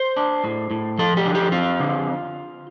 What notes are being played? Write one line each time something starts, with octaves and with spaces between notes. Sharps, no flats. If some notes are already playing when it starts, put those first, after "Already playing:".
Already playing: C5
D4
A2
A2
F3 A4
G4
D3
G4
C4 F4
D3